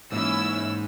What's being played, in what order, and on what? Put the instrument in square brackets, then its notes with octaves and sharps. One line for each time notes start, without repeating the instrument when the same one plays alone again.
[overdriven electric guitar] G#2 [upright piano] E3 A#3 [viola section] C#4 E4 [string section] E6